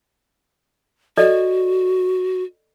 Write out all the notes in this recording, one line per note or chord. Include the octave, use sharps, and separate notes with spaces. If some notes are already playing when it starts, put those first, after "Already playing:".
F#4 A4 D5 D#5